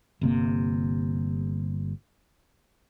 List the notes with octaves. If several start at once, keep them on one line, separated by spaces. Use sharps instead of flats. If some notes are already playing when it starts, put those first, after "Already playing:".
G1 C3 A#3